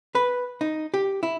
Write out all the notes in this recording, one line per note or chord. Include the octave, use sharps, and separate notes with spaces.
B4
D#4
G4
E4